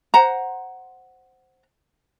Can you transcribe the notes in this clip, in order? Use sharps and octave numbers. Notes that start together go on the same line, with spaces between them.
C5 F#5 A#5